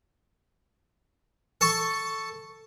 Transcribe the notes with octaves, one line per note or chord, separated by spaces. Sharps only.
A4 A5 C#6